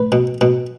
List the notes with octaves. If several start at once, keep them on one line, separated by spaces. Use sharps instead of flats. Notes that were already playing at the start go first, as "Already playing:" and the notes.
Already playing: A2 B4
B2
B2